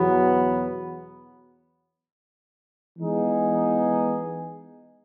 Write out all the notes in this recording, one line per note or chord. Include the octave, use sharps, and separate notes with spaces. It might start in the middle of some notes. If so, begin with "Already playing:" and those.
Already playing: E2 B2 F#3 B3
E3 G#3 B3 D#4 G#4